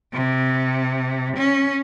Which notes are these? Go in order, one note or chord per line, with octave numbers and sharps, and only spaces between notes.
C3
C#4